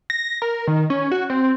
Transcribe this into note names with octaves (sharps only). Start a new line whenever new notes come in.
A#6
A#4
D#3
C#4
F#4
C4